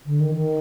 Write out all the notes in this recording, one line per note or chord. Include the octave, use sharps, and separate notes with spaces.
D3
D#3
D#3